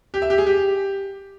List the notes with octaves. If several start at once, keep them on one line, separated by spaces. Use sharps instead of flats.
G4
E5
G4
G#4
G4